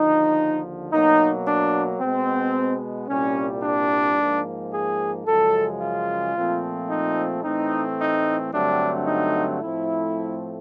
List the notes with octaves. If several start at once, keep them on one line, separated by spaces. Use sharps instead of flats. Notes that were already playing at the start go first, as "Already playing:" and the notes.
Already playing: D#2 D3 F3 D#4
B2 F#3 A#3 D#4
D4
B2 G#3 B3 C4
C2 A#2 G3 C#4
D4
G#2 F3 A#3
G#4
F#2 C#3 F3 G#3 A4
F4
A#2 F3 A3 C4
D#4
A2 E3 A3 C4 D#4
D#4
G2 D3 F#3 A3 C4 D4
D#4
A2 F3 A3 C4 E4